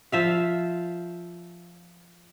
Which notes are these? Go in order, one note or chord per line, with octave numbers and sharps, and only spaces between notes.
F3 E5 F5